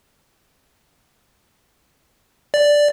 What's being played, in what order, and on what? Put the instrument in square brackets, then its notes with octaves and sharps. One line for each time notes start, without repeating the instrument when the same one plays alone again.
[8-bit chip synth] D5